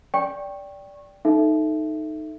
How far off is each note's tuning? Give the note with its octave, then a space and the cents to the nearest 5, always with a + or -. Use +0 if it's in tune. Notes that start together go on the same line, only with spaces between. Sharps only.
D5 -15 G5 +0 C#6 -25
D#4 -5 A4 +0 E5 +10